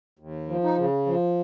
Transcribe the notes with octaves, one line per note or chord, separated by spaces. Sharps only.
D#2
F3
D#4
C#3
F3